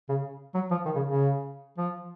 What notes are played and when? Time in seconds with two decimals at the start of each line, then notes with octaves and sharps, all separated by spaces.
0.09 C#3
0.54 F#3
0.71 F3
0.85 D#3
0.95 C#3
1.06 C#3
1.78 F3